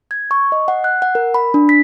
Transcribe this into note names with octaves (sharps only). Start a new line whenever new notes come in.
G#6
C#6
D#5
F#5
F#6
F#5
A#4
B5
D4
B6